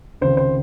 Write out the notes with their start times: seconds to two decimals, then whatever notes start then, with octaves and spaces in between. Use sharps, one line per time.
0.21 C#2 C3 D#3 C5
0.37 C5